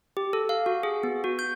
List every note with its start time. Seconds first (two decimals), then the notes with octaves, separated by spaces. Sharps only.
0.17 G4
0.33 A4
0.49 F5
0.66 F#4
0.83 G#4
1.03 B3
1.24 F#4
1.39 G6